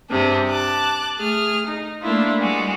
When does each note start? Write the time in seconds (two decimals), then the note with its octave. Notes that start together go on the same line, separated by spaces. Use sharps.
0.10 G2 C3 D4 G#4
0.48 A5 D6 F#6
1.16 A3 G#4 F6
1.66 D#4
2.02 A3 A#3 D4 E4 F4
2.40 G3 G#3 F#4